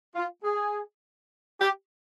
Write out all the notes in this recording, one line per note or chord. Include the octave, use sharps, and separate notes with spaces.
F4
G#4
G4